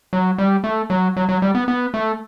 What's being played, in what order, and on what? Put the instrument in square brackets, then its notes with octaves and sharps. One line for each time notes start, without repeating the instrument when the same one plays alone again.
[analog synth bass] F#3
G3
A3
F#3
F#3
F#3
G3
B3
B3
A3